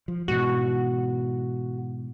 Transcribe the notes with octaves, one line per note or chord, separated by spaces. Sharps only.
F3
G#2 B2 E3 F#4